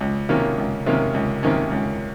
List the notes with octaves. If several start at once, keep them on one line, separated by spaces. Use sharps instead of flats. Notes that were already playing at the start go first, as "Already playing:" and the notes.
C#2
C3 D#3 A#3 C#4
C#2
C3 D#3 A#3 C#4
C#2
C3 D#3 A#3 C#4
C#2